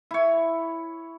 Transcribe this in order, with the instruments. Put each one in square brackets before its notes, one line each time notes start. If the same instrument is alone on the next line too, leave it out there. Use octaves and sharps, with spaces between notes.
[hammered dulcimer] E4 C#5